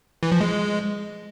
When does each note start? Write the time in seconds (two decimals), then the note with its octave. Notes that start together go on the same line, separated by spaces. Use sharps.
0.23 E3
0.32 F3
0.41 G#3